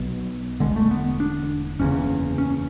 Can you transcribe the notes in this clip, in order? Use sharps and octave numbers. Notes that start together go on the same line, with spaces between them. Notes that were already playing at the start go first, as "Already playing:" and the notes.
Already playing: B1 B2 F#3
E1 E2 D3 G#3
A3
B3
D4
F#1 E2 C#3 C#4
C#4